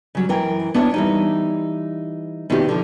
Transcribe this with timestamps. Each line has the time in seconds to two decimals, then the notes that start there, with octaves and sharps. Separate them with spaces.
0.15 C#3 F#3 G3
0.29 F#2 E3 A#4 G5
0.74 B3 D4 E4 B4 C#5 E5
0.94 E3 G3 D#4
2.50 B2 D#3 C4 D4 E4 G4
2.69 D3 F3